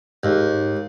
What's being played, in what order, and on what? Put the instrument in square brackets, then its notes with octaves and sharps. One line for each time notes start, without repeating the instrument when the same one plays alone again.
[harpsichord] D#2 [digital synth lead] G#2